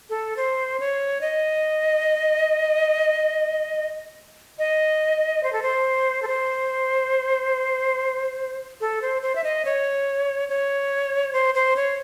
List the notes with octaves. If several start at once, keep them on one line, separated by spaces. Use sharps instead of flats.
A4
C5
C#5
D#5
D#5
C5
A4
C5
A4
C5
A4
C5
C5
E5
D#5
C#5
C#5
C5
C5
C#5